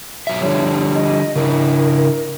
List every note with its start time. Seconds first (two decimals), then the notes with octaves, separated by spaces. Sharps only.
0.27 B2 F#3 E5
0.41 D3 F3 G3 C#5
0.94 D#5
1.36 C#3 D4 E4 A#4